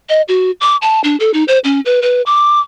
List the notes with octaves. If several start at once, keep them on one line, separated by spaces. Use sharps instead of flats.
D#5
F#4
D6
A5
D4
A4
D#4
C5
C#4
B4
B4
D6